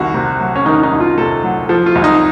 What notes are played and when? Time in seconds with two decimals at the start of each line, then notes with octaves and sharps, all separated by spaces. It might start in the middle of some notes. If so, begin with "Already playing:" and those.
Already playing: C2 D#3 F#4
0.14 C3
0.40 F#3
0.56 C#4
0.66 D#3 D#4
0.83 D#4
0.92 C2
1.00 F4
1.17 C3 A4
1.44 F#3
1.69 F3 A4
1.86 F4
1.95 C2
2.04 D#4